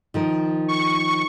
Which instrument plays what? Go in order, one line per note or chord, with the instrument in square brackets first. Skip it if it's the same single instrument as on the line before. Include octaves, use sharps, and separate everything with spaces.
[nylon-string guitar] D#3 F3 A#4
[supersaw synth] C#6